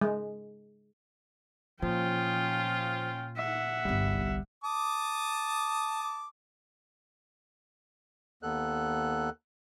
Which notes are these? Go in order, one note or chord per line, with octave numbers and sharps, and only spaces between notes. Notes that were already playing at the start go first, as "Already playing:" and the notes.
G#3
A#2 F3 C#4 F4 G5
E5 F#5
G1 C2 G3
A5 D6 D#6
D#2 B3 A4 F#6